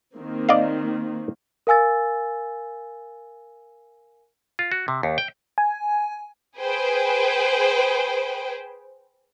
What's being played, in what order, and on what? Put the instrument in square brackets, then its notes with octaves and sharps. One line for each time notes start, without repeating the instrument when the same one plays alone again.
[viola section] D#3 A#3 C4
[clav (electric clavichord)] D5 D#5 F5
[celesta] A#4 F5 G#5 E6 A6
[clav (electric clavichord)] F4
F#4
C3
D#2
G5
[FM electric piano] G#5
[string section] G#4 B4 C5 G5